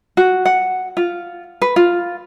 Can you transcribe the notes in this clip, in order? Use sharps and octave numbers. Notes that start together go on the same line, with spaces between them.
F#4
F#5
F4
B4
F4